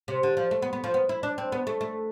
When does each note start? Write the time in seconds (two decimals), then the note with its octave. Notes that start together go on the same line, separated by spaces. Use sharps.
0.08 C3
0.23 D3
0.37 F3
0.51 A3
0.62 B3
0.73 B3
0.84 F3
0.94 B3
1.09 E4
1.23 D4
1.38 C4
1.52 B3
1.67 A3
1.81 A3